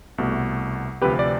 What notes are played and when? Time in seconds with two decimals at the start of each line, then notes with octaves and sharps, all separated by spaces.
0.18 C2 B2 A3
1.02 D2 C3 F3 C4 G4 B4
1.19 D5